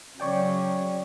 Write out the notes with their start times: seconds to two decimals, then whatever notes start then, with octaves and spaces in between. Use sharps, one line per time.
0.20 C#3 F#3 C#4 C#5 D5 G5